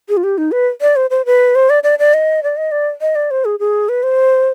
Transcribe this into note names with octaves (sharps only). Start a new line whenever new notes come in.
G#4
F4
G4
D#4
B4
D5
C5
C5
B4
C5
D5
D5
D5
D#5
D5
D#5
D5
D#5
D5
C5
G#4
G#4
B4
C5